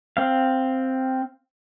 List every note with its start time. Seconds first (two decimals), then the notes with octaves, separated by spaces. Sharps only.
0.17 C4 F5